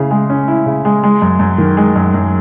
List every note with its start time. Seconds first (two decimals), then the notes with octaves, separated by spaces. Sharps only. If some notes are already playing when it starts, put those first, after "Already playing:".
Already playing: C#3 C#4 E4
0.11 G#3
0.30 C#4
0.48 E4
0.66 C#3
0.85 G#3
1.04 G#3
1.22 F#2
1.39 F#2
1.58 D#3
1.77 G#3
1.96 F#2
2.14 F#2